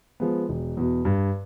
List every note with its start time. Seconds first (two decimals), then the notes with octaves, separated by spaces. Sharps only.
0.20 F3 G#3 B3
0.49 E1
0.77 E2 B2
1.05 G2